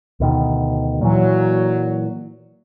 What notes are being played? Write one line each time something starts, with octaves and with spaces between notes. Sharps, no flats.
D2 B2 D#3
A#2 E3 F#3